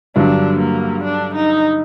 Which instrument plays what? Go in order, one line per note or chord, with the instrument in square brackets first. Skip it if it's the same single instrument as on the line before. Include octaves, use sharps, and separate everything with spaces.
[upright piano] G2 D3 F#3 [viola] D4
[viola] A#3
D4
D#4